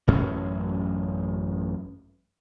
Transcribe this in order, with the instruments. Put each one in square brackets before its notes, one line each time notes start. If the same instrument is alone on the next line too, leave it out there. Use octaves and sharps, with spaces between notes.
[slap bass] A1 F#2 C#4